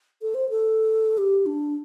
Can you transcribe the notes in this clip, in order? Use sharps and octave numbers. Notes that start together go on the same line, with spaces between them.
A4
C5
A4
G4
D4